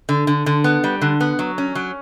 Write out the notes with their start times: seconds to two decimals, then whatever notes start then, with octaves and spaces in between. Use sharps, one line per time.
0.09 D3
0.27 D3
0.46 D3
0.64 B3
0.84 G3
1.01 D3
1.21 B3
1.39 F#3
1.58 C#4
1.75 F#3